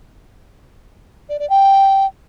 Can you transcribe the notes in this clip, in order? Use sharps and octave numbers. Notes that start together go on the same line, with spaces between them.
D5
D5
G5